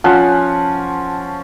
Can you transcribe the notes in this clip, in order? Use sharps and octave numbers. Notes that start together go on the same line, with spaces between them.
F3 C#4 F#5